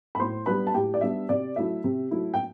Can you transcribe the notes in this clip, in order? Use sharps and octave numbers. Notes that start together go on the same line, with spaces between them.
B5
A2 C5 C6
G3 B3 D4 B4 B5
A5
A2 G4 G5
D5
G3 B3 D4 E5
C3 D5
F#3 A3 E4 E5
C3
F#3 A3 E4
G5